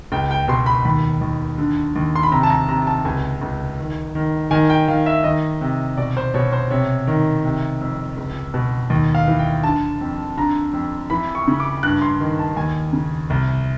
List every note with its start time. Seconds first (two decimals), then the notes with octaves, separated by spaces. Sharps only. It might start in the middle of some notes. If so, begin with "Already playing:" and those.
0.12 C#2 G5
0.31 G5
0.48 B2 C6
0.66 B5
0.85 D#2 B5
1.21 D#2
1.58 D3
1.96 D#2
2.16 C6
2.23 B5
2.32 C3 A#5
2.43 A5
2.50 A#5
2.69 C3 A#5
2.87 A5
3.05 C#2 G#5
3.42 C#2
3.79 D#3
4.15 D#3
4.51 D#3 G#5
4.70 G5
4.88 D#3 F5
5.06 E5
5.24 D#3 D#5
5.61 C3
5.97 B2 D5
6.17 C5
6.34 B2 C#5
6.53 C5
6.71 C3 C#5
7.07 D#3
7.45 C3
7.81 F2
8.17 C#2
8.54 B2
8.90 D#2
9.15 F5
9.28 E3
9.39 G5
9.63 D3 A5
10.01 F2
10.37 D3 A#5
10.73 F2
11.10 E3 B5
11.35 C#6
11.48 C#3
11.60 D6
11.83 G2 F#6
12.02 C6
12.20 D#3
12.39 A5
12.57 D#2 G#5
12.93 C#3
13.30 C2